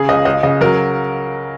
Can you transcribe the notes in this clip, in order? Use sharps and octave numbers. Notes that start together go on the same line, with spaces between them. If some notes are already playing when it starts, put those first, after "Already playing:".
Already playing: C#3 G#4
C#2 D#5
C#2 D#5
C#3 D#5
F#3 A#4